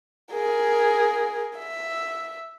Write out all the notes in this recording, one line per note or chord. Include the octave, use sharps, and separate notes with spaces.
G#4 A#4
E5